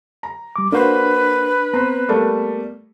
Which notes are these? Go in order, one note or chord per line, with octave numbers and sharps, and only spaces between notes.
A#5
G3 D6
A#3 D4 F#4 B4 C5
B3 C4 A#5
G3 A3 A#3